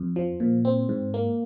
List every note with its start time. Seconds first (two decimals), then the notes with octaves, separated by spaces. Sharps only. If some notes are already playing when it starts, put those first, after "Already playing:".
Already playing: F2
0.16 F3
0.40 A#2
0.65 C4
0.89 G#2
1.14 A#3